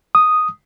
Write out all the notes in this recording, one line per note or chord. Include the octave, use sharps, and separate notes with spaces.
D#6